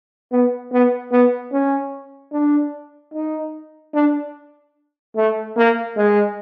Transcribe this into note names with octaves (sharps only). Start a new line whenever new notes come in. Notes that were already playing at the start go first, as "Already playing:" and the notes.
B3
B3
B3
C#4
D4
D#4
D4
A3
A#3
G#3